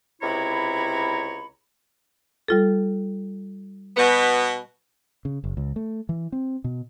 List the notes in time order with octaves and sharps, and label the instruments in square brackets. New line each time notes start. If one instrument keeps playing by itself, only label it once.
[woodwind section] C#2 C3 E4 C#5 A#5 B5
[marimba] G3 F4 A4
[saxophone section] B2 B3
[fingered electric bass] C#3
F#1
C#2
A3
E3
C4
B2